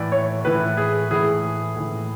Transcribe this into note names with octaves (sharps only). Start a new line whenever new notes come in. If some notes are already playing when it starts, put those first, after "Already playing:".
Already playing: A2 E3 D5
C#5
A2 E3 B4
G#4
A2 E3 G#4
A2 E3